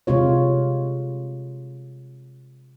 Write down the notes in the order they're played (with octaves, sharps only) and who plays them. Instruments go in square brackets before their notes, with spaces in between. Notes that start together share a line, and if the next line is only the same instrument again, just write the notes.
[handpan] C3 G#3 F4 C#5